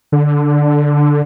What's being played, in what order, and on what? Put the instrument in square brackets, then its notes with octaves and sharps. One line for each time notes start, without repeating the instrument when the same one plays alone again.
[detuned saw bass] D3